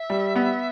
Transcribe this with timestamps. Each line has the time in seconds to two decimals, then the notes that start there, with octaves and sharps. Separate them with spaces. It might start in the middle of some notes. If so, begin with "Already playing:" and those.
Already playing: E5
0.10 G3
0.36 B3